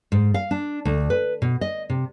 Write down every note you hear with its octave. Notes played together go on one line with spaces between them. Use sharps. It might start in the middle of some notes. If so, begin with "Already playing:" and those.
G#2
F5
D4
D2
B4
B2
D#5
C3